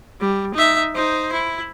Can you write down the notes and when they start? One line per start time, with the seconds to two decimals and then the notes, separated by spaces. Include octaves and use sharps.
0.21 G3
0.54 D#4 E5
0.95 D#4 C5
1.32 E4